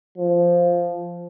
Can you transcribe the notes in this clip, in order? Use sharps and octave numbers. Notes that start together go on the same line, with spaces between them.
F3